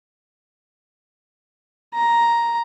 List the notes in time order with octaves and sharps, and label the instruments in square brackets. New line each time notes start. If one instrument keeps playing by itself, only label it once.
[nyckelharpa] A#5